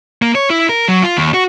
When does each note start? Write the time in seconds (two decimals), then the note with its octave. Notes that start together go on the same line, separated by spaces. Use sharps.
0.22 A#3
0.35 C#5
0.50 E4
0.69 A#4
0.88 F#3
1.03 F4
1.17 D#2
1.34 F#4